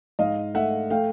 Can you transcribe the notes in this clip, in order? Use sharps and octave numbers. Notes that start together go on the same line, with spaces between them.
G#2 D#5 F5
A3 E5 F#5
A3 F5 G5